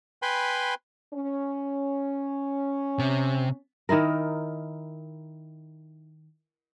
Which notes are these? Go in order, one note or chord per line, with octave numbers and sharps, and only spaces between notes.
B4 G5 G#5 B5 C6
C#4
C3
D#3 D#4 E4 A#4